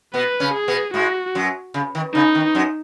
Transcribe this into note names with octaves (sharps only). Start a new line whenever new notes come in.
B2 B3 B4
C#3 C#4
G#4
B2 B3
G#2 G#3 F#4
F#2 F#3
C#3
D#3
C#3 D#4
D#3
F#2 F#3